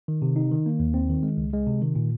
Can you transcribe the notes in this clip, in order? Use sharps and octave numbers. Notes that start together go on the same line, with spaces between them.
D#3
C3
D#4
D#3
A#3
D#2
C4
D#3
G#3
C#2
G#3
C3
D#3
A#2